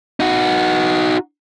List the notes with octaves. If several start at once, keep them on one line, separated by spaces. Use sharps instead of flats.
D#4 F#4